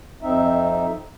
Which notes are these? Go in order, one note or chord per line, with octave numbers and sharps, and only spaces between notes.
F2 C4 D#4 E5